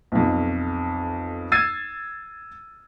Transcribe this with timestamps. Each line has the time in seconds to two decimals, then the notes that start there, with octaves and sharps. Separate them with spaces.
0.12 B1 F2
1.52 E6 G#6 A6 C7 D#7